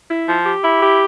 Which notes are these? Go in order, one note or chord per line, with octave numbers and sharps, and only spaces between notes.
E4
F3
G4
E4
G4